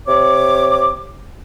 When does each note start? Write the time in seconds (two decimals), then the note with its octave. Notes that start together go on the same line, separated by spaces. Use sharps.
0.08 C3 C#5 D6